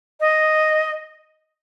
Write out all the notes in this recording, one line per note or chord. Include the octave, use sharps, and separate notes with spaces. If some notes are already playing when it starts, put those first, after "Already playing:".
D#5